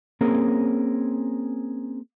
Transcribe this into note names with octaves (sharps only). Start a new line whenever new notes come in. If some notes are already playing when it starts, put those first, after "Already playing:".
A#3 C4 C#4 G#4 A#4